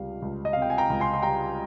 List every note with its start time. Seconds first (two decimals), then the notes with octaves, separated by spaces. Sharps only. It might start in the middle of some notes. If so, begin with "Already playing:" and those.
Already playing: C#2 C3 G3 F5
0.22 C#2
0.45 D#5
0.53 C3 F5
0.62 G5
0.70 G#5
0.78 G5 A#5
0.90 C#2
1.00 G#5 C6
1.13 C6
1.22 G3 G5 A#5